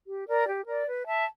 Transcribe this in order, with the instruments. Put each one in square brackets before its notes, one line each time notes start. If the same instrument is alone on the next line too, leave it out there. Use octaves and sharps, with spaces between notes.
[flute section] G4
A#4 D5
G4
A#4 D5
B4
E5 A5